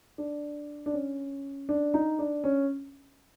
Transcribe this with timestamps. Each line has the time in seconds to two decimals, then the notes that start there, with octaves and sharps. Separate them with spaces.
0.18 D4
0.86 D4
0.93 C#4
1.69 D4
1.94 D#4
2.19 D4
2.44 C#4